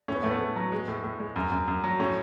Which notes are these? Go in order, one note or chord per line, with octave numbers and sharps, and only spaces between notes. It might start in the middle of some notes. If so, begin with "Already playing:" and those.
A2 C#4
B3
A2 A3
B3
A2
F#3
G#3
A2
A2
G#3
F#2
F#2
F#2
F#3
A2 C#4